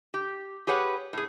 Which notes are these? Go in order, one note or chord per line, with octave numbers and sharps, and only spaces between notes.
G4
G4 G#4 B4 C#5 F#5
A2 G#4